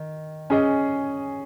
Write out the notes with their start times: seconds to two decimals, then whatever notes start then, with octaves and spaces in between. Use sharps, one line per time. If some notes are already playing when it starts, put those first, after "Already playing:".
Already playing: D#3
0.50 C#4 G#4 D#5